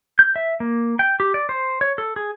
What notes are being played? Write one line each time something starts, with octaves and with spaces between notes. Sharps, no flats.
G6
E5
A#3
G5
G4
D5
C5
C#5
A4
G#4